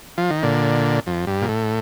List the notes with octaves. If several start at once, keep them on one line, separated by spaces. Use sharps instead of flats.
F3
D#3
A#2 D3
F2
G2
A#2
A2